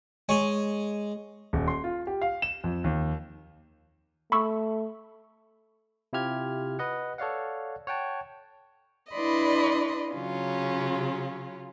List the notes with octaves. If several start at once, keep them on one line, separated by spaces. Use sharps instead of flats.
G#3 C#5 G#5 C#6
D#1
C6
F4
G4
F5
E7
F2
D#2
A3 B5 C#6 E6
C3 E4 F4 G4 F6 G#6
B4 D#5 F#5
A4 C#5 D5 F5 F#5
C#5 F#5 G5 A5
D4 E4 B4 D5 D#5 C6
C#3 F#3 C#4 F4